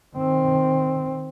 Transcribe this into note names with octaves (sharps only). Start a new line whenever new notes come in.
D#3 C4